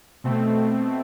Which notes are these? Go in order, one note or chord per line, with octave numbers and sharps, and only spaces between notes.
B2 A3 C4